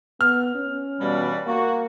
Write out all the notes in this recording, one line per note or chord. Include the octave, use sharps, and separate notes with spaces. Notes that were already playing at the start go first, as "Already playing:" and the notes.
B3 F6
C#4
G2 B2 E3 G3
A#3 F#4